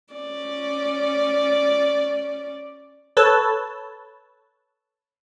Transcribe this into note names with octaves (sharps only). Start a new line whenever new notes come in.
C#4 D5
A4 B4 C#5 A5